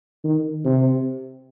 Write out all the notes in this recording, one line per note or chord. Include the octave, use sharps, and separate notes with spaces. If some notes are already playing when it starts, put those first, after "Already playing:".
D#3
C3